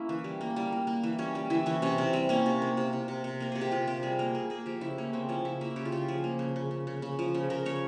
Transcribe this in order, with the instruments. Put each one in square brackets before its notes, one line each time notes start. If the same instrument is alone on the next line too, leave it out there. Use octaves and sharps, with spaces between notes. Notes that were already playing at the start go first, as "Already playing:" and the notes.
Already playing: [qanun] A#3 C#4 E4
E3
G3
A#3
G3
A#3
A#3
E3
G3 C#4
G3
E3 E4
E3 C#4
C3 C#4
C3 C#4
G3 C4
A#3 C#4
C3
A#3
C3
C3
C3
C3
A#3 A#4
C3 G#4
G4
C3 F4
C3 G4
G3 G#4
A#3 A#4
A#3 G#4
A#3 G#4
F3 G4
C#3 E4
A#3 C#4
C#3 C4
F3 C#4
C#3 E4
A#3 E4
C#3 G4
F4
C#3 G4
F3 G#4
A#3
C#3
C#3
C#3
C#3
C#3
F3
C#3
C#3 A#4
C#3 C#5